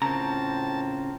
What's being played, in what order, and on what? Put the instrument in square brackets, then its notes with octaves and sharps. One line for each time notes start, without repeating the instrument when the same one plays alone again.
[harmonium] A2 F4 A#4 [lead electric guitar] C#3 C4 [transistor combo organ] A5 [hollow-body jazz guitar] A#5